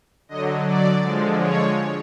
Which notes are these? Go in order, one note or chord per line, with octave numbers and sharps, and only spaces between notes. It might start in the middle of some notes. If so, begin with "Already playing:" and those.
D3 F#3 D#5
D5
D3 F3 G#3
C#5